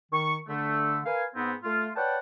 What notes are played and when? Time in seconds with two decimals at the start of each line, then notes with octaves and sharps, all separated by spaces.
0.12 D#3 C#6
0.48 D3 A3
1.05 A#4 B4 F5 G#5
1.35 G#2 B3 C4
1.64 A3 F4
1.96 B4 C#5 D5 F#5 G5 A5